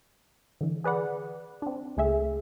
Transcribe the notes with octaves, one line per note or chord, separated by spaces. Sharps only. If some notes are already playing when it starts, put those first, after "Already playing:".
D3 E3
G#4 B4 D5 F#5
C4 D4
C#2 A3 G#4 E5